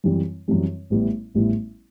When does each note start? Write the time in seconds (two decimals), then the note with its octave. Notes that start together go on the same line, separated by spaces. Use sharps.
0.04 F#2 E3 G3 C4
0.48 F#2 E3 G3 C4
0.90 A1 A2 G3 B3 E4
1.34 A1 A2 G3 B3 E4